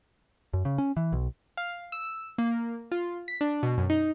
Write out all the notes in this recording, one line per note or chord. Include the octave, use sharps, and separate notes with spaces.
F#2
C#3
C#4
E3
B1
F5
E6
A#3
F4
B6
D4
B2
F#2
D#4